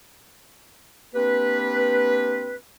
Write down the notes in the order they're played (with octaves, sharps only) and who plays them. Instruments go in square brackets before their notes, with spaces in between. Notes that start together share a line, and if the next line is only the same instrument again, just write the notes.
[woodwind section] A#3 C4 D4 G4 B4